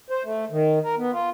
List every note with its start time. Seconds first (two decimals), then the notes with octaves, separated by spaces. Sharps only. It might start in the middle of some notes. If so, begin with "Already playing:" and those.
0.10 C5
0.24 A3
0.51 D#3
0.84 A#4
0.98 B3
1.12 F4